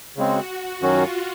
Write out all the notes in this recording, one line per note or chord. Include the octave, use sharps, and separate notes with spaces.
C#3 G#3 C4 F#4
F#2 D#3 F#3 C#4 F4 F#4